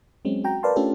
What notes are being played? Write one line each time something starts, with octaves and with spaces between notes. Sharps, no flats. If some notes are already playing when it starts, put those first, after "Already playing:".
F#3 G#3 C4 C#4
F#4 G5 A#5
A#4 B4 D5 F5 A5 C6
A3 C#4 D4 F4 G4 A4